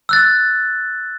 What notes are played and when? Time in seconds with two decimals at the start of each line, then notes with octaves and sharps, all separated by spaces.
0.09 E6 F#6 A6